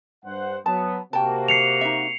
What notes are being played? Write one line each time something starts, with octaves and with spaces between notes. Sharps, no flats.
G2 C5 F#5
F#3 B3 A5
C3 A#3 F#4 G5 A5
C7 C#7 F7
D#4 E5